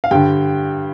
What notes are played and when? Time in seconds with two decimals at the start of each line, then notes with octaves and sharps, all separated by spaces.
0.04 F5
0.11 G2 D3 G5